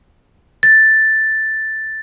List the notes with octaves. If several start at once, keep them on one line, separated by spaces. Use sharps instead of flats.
A6